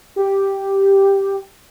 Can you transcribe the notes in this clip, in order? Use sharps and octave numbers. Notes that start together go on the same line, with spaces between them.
G4